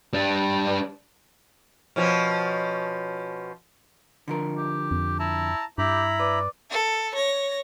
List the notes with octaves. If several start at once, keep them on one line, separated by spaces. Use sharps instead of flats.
G3 D4
B2 F3 C#4
D3 F3 A#4
G4
F2
E4 A5 A#5
G2 E4 G4 A#5 B5
B4 D5
A4
C#5 A#6